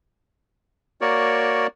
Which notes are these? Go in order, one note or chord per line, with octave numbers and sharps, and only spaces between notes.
A#3 F#4 A#4 C#5 D5